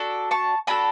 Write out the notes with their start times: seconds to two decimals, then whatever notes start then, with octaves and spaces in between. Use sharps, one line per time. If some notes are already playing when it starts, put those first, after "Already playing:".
Already playing: D4 F#4 A4
0.31 A5 C#6
0.67 D4 F#4 A4 G#5 B5